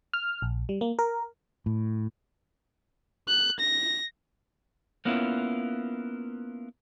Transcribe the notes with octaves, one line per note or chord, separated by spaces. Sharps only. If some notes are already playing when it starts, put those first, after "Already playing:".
F6
A#1
G3
A#3
A#4
A2
F#6
A#6
A#3 B3 C#4 E4 F4